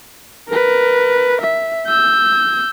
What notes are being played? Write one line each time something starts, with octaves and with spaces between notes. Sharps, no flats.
A#4 B4
E5
E6 G6